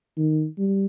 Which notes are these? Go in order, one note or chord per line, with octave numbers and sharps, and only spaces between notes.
D#3
G3